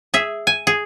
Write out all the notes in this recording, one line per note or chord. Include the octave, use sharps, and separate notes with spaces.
G#4 E5
G#5
G#4